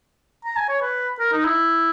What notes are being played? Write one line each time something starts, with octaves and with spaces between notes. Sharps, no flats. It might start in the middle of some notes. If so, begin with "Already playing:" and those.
A#5
G#5
C#5
B4
A#4
D#4
E4